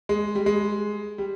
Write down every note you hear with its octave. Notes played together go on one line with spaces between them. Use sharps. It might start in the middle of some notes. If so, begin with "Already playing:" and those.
G#3
G3
G#3
G3